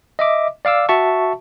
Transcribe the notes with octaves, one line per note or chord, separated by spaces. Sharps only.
D#5 E5 D6
D5 F5 D6 E6
F#4 E5 A5 C#6